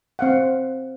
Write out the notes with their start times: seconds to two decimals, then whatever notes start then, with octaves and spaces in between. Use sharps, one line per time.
0.19 C4 F5 F#5